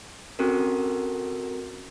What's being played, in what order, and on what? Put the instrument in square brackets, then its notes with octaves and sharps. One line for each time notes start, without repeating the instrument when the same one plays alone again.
[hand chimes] C4 C#4 F#4 A4 A#4